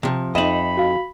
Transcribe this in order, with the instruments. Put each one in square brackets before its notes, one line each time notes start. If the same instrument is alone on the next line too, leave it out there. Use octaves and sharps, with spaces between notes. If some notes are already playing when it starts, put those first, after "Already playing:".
[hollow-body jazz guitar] C3 F3
[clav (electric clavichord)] F2 [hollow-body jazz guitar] D#4 D#5 [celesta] E5 E7 F#7 [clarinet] B5
[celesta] F#4 F5